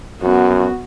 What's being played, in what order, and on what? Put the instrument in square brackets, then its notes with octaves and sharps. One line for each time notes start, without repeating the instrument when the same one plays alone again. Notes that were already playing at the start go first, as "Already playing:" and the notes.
[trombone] F#2 [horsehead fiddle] B3 F#4